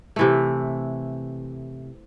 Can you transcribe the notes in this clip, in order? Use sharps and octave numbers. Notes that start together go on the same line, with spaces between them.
C3 E3 A3